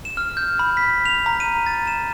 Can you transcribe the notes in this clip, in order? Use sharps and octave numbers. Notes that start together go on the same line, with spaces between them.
E7
F6
G6
B5
B6
F7
A#5
D#7
A6
E7